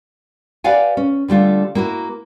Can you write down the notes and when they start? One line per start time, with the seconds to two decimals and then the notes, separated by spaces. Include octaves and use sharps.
0.64 G4 B4 D5 F5 F#5 G#5
0.97 C#4
1.28 D3 G3 A3 F4
1.75 A#3 E4 F#4 A#4